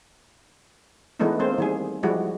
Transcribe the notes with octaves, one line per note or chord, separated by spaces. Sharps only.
E3 G#3 A3 B3 D4 D#4
G#3 A#3 C4 C5
D#3 G3 G#4
F3 G3 G#3 E4 F#4